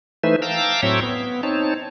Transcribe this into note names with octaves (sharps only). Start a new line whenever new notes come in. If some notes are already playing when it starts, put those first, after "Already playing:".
E3 A3 D#4 B4 C5 E5
F5 G5 A5 A#5 D6 E6
A2 F#3 C4 C#5 E5 G5
B3
C4 D#4 C#5 A5